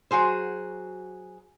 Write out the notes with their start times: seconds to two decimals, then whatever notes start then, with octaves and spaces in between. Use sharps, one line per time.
0.11 F#3 F#4 G#4 C5